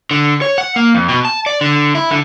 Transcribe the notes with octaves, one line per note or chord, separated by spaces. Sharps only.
D3
C#5
F#5
A#3
F2
B2
A5
D5
D3
E4
D3